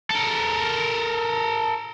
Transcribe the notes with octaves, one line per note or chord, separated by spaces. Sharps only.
A4 A#4